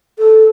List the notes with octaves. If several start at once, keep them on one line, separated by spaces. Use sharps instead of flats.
A4